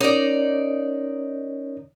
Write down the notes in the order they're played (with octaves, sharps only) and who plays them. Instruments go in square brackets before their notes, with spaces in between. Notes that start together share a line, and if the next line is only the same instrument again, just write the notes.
[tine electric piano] C#4 A#4 C#5 [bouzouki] D#4 D5